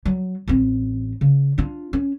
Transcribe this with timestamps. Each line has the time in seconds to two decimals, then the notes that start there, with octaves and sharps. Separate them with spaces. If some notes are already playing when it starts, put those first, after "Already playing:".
0.05 F#3
0.48 A1 C4
1.21 C#3
1.58 D4 F4
1.93 C#4